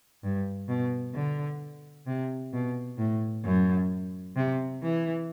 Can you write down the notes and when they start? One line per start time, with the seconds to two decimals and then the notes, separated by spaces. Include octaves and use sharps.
0.24 G2
0.69 B2
1.15 D3
2.07 C3
2.53 B2
2.98 A2
3.45 F#2
4.36 C3
4.82 E3